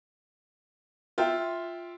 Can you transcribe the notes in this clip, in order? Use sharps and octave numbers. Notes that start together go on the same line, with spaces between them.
F4 E5 G5